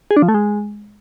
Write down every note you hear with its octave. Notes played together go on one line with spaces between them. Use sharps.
G#4
D4
F3
A3
G#3